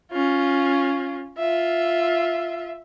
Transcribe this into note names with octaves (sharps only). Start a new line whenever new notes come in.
C#4 F4
F4 E5